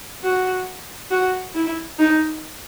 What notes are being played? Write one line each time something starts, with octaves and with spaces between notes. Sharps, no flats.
F#4
F#4
E4
D#4